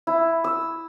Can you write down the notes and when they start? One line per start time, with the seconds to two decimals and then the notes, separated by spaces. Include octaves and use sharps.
0.07 E4
0.44 E6